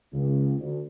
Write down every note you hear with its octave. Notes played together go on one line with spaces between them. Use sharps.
C#2
D2